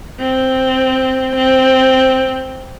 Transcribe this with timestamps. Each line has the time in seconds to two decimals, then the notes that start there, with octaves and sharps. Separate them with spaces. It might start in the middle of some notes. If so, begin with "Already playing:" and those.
0.20 C4
1.36 C4